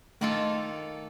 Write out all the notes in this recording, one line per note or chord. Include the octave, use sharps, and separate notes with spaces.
D#3 A3 A#3 F4 A4